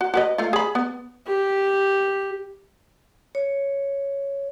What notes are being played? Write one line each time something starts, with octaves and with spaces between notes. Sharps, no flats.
F#4
F#4 B4 D#5
A3 F4
G#4 B5
B3
G4
C#5